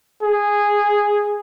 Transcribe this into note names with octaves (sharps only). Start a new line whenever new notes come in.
G#4